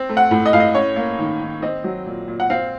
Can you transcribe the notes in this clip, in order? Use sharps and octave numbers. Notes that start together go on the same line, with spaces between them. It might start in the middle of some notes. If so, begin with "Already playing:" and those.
Already playing: C4
A3
F#5
A2
D#5
A2 F5
D#5
C#4 C#5
A#3
D#3
D#3
C4 D#5
F#3
A#2
A#2
F#5
C4 F5